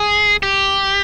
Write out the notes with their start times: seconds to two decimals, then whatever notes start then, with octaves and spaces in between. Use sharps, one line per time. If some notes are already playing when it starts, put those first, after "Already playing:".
Already playing: G#4
0.43 G4